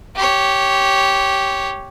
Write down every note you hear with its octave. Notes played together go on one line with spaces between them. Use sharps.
G4 C#5